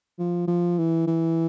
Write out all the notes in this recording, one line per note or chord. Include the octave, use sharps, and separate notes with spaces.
F3
F3
E3
E3